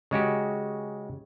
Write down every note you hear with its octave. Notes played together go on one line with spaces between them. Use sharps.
C#3 G#3 F#4 G4